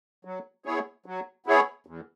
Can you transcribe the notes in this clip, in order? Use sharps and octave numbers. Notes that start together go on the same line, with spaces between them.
F#3
B3 E4 G#4 C#5
F#3
B3 E4 G#4 C#5
E2